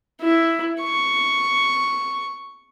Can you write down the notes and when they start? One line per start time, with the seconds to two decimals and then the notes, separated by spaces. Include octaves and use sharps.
0.21 E4
0.82 C#6